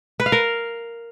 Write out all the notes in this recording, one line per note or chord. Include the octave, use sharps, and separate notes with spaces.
B4
F5
A#4